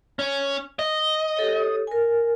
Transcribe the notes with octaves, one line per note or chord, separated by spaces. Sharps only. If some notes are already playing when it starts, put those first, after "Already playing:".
C#4
D#5
G4 A4 C#5
A#4 G#5